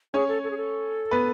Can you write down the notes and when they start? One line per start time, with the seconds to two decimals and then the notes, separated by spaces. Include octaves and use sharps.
0.14 C#4 G#4 C#5
0.28 A4
0.44 A4
0.51 G#4
0.57 A4
1.11 B3 B4